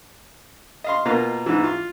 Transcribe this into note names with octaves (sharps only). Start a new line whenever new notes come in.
D#5 F5 C6
B2 A#3 F4 F5 A#5
G#2 E3
F4